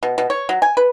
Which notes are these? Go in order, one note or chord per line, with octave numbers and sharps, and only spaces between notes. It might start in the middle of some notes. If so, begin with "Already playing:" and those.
B2
B2
C#5
F#3
G#5
B4